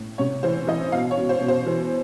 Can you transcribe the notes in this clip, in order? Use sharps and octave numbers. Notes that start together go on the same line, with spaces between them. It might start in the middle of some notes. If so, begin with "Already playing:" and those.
Already playing: A2
C3 C#5
E3 C5
E3 D#5
B2 F5
C#5
B2
C5
B2
C5
E3